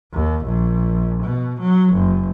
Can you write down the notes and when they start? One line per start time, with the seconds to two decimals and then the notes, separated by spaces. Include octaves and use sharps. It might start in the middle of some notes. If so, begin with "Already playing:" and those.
0.13 D#2
0.46 A#1
1.23 B2
1.60 F#3
1.93 F#1